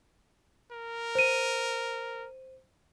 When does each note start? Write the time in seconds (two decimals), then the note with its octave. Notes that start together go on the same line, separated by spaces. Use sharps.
0.72 A#4
1.15 C5 D#7